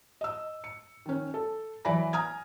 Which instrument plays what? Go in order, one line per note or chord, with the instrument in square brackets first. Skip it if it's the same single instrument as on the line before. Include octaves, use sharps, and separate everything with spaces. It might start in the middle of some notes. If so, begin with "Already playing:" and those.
[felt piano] D#5 E6
C#7
D#3 C#4
A4
E3 F#3 D5 G#5 B5 A#6
G#5 A#5 D#6 F6 G#6